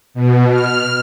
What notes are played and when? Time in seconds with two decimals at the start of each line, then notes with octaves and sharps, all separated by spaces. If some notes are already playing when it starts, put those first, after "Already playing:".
0.14 B2
0.51 F6